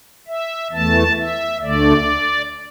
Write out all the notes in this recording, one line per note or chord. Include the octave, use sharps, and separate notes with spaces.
E5
E2 E3 A3 A5
E5
D2 D3 A3 D5